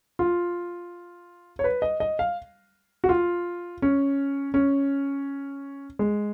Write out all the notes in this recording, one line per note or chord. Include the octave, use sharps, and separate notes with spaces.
F4
C#5
B4
D#5
D#5
F5
F#4
F4
C#4
C#4
G#3